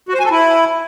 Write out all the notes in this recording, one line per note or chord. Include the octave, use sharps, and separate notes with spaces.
F#4
C5
G#5
A4
E4